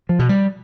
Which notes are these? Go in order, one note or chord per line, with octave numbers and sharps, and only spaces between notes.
F3
B2
G3